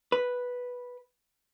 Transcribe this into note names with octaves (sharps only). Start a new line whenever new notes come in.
B4